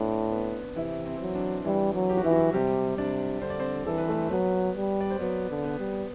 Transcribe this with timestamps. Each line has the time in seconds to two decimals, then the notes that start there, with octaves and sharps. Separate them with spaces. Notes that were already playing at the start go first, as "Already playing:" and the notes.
Already playing: A2 B3 C4 D4 B4 D5
0.31 B3 B4
0.75 C3 E3 E4
1.06 C4
1.20 F#3
1.35 D4
1.64 E3 G3 E4
1.94 F#3
2.10 G4
2.17 F#4
2.24 E3 E4
2.31 F#3 F#4
2.53 C3 G3 G4
2.98 C3 D4 D5
3.42 D3 C5
3.50 D5
3.59 C4 C5
3.86 E3 A4
3.98 B4
4.09 A3 A4
4.31 F#3 B3 B4
4.76 G3
5.01 D5
5.10 C5
5.20 F#3 B3 B4
5.50 D3
5.64 B3 B4
5.79 G3